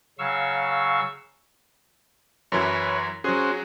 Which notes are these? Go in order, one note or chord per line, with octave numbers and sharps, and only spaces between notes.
C#3 F#3 F5 C#6 E6
F#2 E3 F#3 B4 C#5
F#3 C#4 F#4 G#4 C5